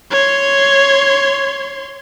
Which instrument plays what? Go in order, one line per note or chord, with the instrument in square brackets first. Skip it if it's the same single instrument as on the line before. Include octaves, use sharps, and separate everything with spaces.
[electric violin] C#5 C6